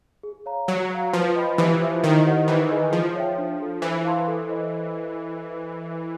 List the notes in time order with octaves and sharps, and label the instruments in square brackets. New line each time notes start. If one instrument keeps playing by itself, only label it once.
[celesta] G#4
C#5 F5 A#5
[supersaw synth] F#3 [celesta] C#5
[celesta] F5 A#5
[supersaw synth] F3 [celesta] B4
[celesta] D#5 G5 B5
[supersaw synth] E3 [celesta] G4
[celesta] C5 E5
[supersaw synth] D#3 [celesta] E4
[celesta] G4 C5 D#5 F#5
[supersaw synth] E3 [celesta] D#4
[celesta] G#4 B4 D#5 G#5
[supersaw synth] F3 [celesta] G#4
[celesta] C#5 E5 G5
D4
F4 A4
[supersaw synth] E3 [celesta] C5
[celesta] F5 A5 C6
A4
C5 D#5